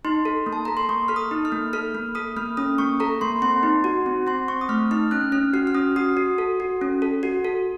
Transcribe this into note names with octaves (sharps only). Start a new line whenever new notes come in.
D#4 C6
A4
A#3
A5
A4 A#5
C6
A#3 C#6
A4 F6
D#6
D#4
F6
A#3
A4 F6
A#3
A4 D#6
A#3 F6
C#4 D#6
A#3 C#6
A4 A#5
A#3 C6
C4 C6
D#4
F#4
C4
C4 C6
C4 C#6
D#6
A3 F6
D#4 F6
C#4 F#6
C#4 F6
F#4 F6
F6
C#4 D#6
F#4 D#6
F#4
A4
F#4
C#4
A4
F#4
A4